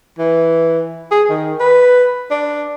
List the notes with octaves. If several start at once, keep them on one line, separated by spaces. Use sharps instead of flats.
E3
G#4
D#3
B4
D4